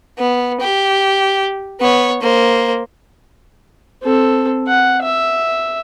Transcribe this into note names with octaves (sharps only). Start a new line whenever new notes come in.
B3
G4
B3 C#5
A#3 C5
C4 A4
F#5
E5